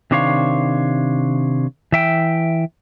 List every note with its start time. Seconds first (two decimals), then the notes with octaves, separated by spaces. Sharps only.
0.11 C3 D#3 D4 C5 C#5 F5
1.92 E3 E5 G5